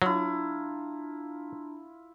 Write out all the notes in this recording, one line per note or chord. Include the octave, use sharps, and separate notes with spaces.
F#3 D4 E4 F4 A5 A#5